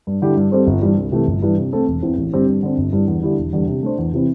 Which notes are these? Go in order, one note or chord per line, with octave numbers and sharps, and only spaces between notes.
G2
D3 G3 E4 G4
G2
G3 C4 A4 C5
G1
G2 E3 G3
C2
C3 E3 A3
G1
G2 E3
C3
A3 C4 A4
E1
E2 E3 C4
A1
G2 D3 C4 G4
G2
D3 C4
G1
G2 D3 G3 E4
E2
D3 G3 E4 G4
E1
E2 D3 G3
C3
A3 D4 C5
E2
C3 E3 C4 E4